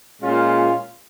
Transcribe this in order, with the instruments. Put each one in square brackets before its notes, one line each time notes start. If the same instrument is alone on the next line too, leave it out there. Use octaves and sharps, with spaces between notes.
[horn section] A#2 G#3 C#4 F4